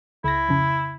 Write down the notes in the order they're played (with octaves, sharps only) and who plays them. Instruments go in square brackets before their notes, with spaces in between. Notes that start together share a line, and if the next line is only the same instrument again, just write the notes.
[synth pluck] C#2 A#6 [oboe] E4
[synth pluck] F2 C#3